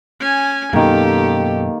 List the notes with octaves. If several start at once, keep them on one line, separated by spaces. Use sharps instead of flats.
C#4 G#5
F#2 B2 D#3 A#3 G4 A4